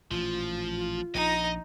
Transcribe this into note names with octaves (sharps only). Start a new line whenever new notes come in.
A1 A#2 F3 F4
A#1 D#4 D#5